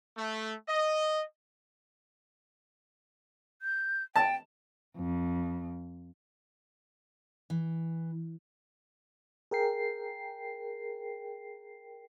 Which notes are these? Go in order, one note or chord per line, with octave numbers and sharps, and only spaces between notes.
A3
D#5
G6
G5 A5
F2
E3
G#4 A#4 G5 C7